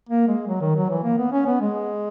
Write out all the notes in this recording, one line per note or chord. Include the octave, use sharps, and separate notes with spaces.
A#3
G#3
F#3
D#3
F#3
E3
A#3
B3
C#4
B3
G#3